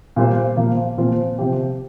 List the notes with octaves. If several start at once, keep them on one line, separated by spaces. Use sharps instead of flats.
A#2 G3 A#3 F4 C5
A#2 F3 A#3 F4
A#2 F3 C4 F4
C3 F3 C4 G4